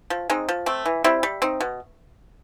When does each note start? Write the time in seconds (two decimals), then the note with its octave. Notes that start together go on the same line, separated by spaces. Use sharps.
0.10 F3
0.30 G#3 C4 D#4
0.49 F3
0.66 A3 C4
0.86 E3
1.04 G3 C4 E4
1.23 G3
1.42 C4 D#4
1.61 B2